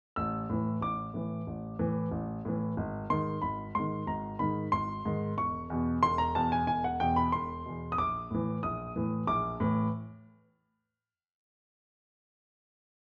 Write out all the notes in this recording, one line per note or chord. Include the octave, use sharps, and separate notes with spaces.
A1 E6
A2 E3
A1 D6
A2 E3
A1
A2 E3
A1
A2 E3
G#1
G#2 D#3 C6
G#1 B5
G#2 D#3 C6
G#1 A#5
G#2 D#3 B5
G#1 C6
G#2 D#3
E1 C#6
E2 B2
E1 C6
A#5
E2 B2 A5
G#5
E1 G#5
F#5
E2 B2 G5
B5
E1 C6
E2 B2
D#6
A#1 D6
A2 E3
A#1 D#6
A2 E3
A#1 D6
A2 E3